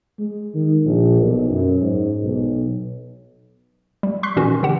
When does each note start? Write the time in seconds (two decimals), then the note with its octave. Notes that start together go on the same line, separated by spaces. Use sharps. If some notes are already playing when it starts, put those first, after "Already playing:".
0.19 G#3
0.54 D#3
0.85 A#1
1.22 B1
1.50 F#2
1.82 G#2
2.23 B1
4.03 G3
4.23 C6 C#6 F#6 B6 C7
4.36 A#2 D#3 E3 C#4 F#4
4.63 D3 E3 G4 F#5 E7